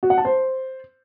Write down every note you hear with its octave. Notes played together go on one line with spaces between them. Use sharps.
F#4
F#5
A5
C5